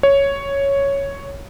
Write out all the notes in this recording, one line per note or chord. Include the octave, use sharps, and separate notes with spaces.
C#5